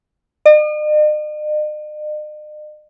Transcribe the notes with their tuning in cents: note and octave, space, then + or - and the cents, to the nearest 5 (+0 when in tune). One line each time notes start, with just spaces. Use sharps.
D#5 -45